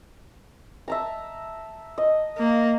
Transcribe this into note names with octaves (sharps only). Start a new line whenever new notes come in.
E5 A5 A#5
D#5
A#3